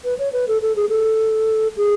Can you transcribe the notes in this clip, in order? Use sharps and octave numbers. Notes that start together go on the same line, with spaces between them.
B4
C#5
B4
A4
A4
G#4
A4
G#4